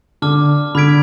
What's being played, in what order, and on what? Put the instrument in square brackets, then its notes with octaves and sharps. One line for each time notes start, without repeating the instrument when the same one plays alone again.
[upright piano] D3 [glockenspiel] A5 D6 F6
[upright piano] D3 [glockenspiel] B5 F6 G#6 B6 D7